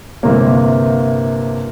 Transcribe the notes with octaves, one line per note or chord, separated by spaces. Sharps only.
G1 C3 A#3